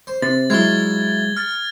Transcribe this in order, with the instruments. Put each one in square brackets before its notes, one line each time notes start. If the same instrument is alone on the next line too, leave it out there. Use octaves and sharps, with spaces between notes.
[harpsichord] C5
[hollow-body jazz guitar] C3 [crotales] A6
[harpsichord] F#3 E4 F4 [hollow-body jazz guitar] G#3 [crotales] G#6 G7
[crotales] F6 A6